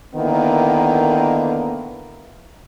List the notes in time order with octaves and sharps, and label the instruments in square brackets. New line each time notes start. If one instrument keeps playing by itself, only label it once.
[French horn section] D3 D#3 A#3 B3 E4